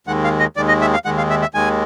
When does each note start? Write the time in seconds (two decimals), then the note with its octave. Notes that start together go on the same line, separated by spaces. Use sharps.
0.07 D#2 D#3 G#3 F#5
0.24 F5
0.40 D#5
0.56 D#2 D#3 G#3 D5
0.68 D#5
0.81 E5
0.94 F5
1.05 D#2 D#3 G#3 F#5
1.18 F5
1.30 E5
1.42 E5
1.54 D#2 D#3 G#3 G#5